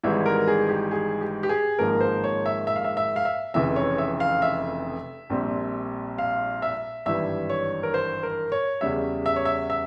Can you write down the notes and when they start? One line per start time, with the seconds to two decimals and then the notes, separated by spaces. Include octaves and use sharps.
0.03 G#1 G#2 E3 G3 E5
0.26 A#4
0.48 G#4
0.65 G#4
0.69 G4
0.91 G#4
1.21 G4
1.43 G4
1.49 G#4
1.79 G#1 G#2 F3 A#3 A#4
2.01 C5
2.24 C#5
2.46 E5
2.67 E5
2.76 F5
2.84 E5
2.97 E5
3.16 F5
3.25 E5
3.54 F1 F2 C#3 E3 E5
3.76 C#5
3.98 E5
4.20 F5
4.42 E5
5.30 A#1 A#2 G3 C4
6.18 F5
6.62 E5
7.06 G#1 G2 E3 G3 E5
7.50 C#5
7.83 A#4
7.94 C5
8.23 A#4
8.52 C#5
8.81 E2 C#3 G3 E5
9.26 E5
9.36 C#5
9.45 E5
9.70 E5